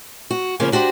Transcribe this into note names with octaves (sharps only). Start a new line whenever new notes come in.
F#4
C#3 F3 A#3 C#4
D4 F#4 G4 C5